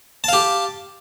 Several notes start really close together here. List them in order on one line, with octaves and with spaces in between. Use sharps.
A5 F5 G4